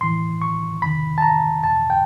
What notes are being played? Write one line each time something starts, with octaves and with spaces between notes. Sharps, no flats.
A2 E3 C6
C#6
E2 C3 D#3 B5
A5
A#5
E2 B2 A5
G5